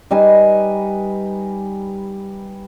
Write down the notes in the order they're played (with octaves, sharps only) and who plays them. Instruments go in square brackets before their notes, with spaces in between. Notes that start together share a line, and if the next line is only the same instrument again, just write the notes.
[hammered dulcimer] G3 D#4 B4 G#5